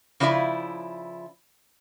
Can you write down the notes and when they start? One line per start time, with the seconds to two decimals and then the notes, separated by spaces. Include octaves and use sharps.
0.20 C#3 F3 E4 D5 E5